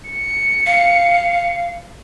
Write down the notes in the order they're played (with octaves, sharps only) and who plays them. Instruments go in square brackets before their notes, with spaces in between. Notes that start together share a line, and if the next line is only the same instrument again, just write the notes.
[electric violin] C#7
[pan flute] F5